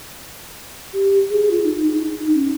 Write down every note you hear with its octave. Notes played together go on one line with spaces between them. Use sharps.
G4
G#4
F4
D#4
D#4
D#4
C#4